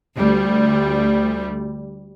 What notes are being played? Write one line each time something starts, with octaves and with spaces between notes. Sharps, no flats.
D2 G3